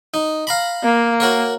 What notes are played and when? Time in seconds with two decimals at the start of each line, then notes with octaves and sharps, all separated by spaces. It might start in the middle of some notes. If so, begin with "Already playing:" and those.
0.14 D#4
0.47 F5 A#5 B5
0.83 A#3
1.20 F#4 A#4 C#5